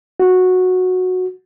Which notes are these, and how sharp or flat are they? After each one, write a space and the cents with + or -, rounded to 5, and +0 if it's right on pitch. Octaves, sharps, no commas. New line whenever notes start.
F#4 -10